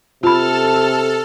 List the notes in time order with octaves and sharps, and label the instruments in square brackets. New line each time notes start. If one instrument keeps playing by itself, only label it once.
[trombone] C3 [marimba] F4 B5 [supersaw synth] A4 [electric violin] A5 F6